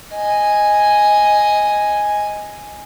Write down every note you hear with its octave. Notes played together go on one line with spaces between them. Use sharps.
D#5 G#5